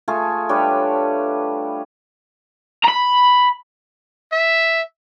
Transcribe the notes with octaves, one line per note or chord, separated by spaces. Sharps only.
A3 F4 G#4
G3 D4 B4 C#5
A#5 B5
E5